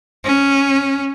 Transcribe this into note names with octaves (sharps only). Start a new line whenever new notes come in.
C#4